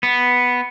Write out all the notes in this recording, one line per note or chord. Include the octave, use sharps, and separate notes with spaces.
B3